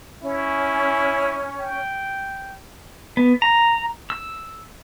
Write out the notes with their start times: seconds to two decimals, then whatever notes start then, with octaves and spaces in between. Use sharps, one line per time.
0.23 C#4 E4
1.60 G5
3.17 B3
3.42 A#5
4.10 E6